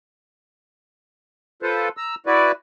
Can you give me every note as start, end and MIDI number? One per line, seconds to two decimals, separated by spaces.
1.62 1.89 65
1.62 1.89 69
1.62 1.89 71
1.62 1.89 72
1.97 2.15 82
1.97 2.15 88
2.26 2.52 64
2.26 2.52 66
2.26 2.52 71
2.26 2.52 74